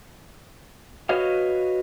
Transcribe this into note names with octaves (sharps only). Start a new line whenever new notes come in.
F#4 B4 C#5 D#5 F5